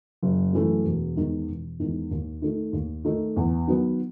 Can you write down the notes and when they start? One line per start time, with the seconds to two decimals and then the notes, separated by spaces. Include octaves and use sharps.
0.22 F#1
0.53 F#2 E3 A3
0.85 E1
1.16 E2 D#3 G#3
1.48 E1
1.79 E2 D#3 G#3
2.11 D#2
2.42 D#3 A3 D#4
2.73 D#2
3.05 D#3 A3 D#4
3.36 E2
3.68 D#3 F#3 B3 F#4